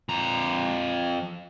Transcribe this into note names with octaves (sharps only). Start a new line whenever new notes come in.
F2 A#5